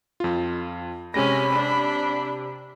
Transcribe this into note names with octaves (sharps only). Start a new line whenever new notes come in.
F2 F4
C3 G#3 C#4 G4 B5 A#6
D4